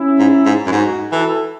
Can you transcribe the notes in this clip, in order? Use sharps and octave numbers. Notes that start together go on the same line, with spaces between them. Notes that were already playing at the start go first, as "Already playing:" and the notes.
Already playing: C#4 E4
G#2
G#2
F#2
G#2 D#4 F#4
E3 F#4 A4